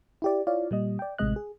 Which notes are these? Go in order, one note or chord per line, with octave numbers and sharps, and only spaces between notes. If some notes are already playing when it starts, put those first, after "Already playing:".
E4 G4 D5
E4 F4 C#5 D5 F5
A#2 G3 D#5
D5 G5
A1 A2 C3 G#3 D#5 F#6
G#4